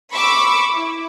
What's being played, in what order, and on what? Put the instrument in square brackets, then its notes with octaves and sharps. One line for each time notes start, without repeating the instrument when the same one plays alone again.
[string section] B5 C#6 D6 E6
E4